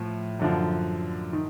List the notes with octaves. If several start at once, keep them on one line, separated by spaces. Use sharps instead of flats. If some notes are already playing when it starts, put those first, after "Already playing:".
Already playing: A2 F3
F#2 D3 F3
D#3